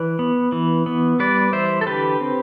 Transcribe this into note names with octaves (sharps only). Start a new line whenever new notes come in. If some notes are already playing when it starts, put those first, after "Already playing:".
Already playing: E3 B4 D5
B3
E3
B3
G3 B4 D5
E3 C5 E5
A4
D3 G4 B4
C4